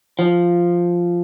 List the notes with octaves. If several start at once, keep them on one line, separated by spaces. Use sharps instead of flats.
F3